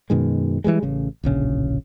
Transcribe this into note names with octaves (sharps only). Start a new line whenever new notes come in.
F#2 B2 D#3 G#3
E3 F3 G3 G#3
A1 C#3
D1 A#1 C#3